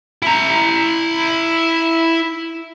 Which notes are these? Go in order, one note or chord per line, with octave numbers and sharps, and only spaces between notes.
E4 A#5